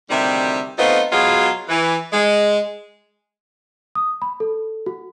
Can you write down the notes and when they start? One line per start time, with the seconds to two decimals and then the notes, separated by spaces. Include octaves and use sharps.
0.10 D2 C3 D#3 G3 D#4 E5
0.78 A3 B3 C4 D#4 F4
1.12 B2 F#3 G#3 F4 G#4
1.69 E3
2.12 G#3
3.95 D#6
4.22 B5
4.40 A4
4.86 F#4